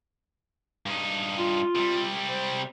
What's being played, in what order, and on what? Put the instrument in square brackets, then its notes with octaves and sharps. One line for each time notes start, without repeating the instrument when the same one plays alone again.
[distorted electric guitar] G2 D#4
[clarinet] F4
[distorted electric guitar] C3 G3
[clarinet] C5